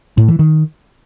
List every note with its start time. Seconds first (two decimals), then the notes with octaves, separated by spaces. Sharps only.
0.18 A2
0.28 E3
0.39 D#3